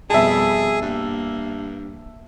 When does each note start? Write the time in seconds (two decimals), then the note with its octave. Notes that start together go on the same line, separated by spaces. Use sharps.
0.10 F2 B2 G3 G#4 E5 A5
0.82 G2 A#3